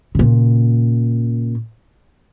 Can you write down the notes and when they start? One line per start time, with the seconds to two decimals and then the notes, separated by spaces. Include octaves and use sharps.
0.15 A#2 C#3